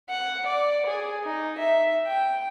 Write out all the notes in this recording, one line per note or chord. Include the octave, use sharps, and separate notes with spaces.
F#5
D5
G#4
D#4
E5
G5